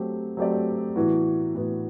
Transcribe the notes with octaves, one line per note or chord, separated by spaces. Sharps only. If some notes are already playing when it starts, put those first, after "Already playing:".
Already playing: F#3 A3 C4 G4
F#3 A3 C4 G4 D5
A2 E3 B3 F#4
A2 E3 B3 F#4